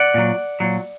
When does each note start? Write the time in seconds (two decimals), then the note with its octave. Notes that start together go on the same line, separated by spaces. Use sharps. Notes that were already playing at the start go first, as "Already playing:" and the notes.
Already playing: D5 F#5
0.14 A#2 F#3
0.60 A#2 F#3